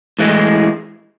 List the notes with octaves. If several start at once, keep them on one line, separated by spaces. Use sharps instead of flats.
A2 E3 G#3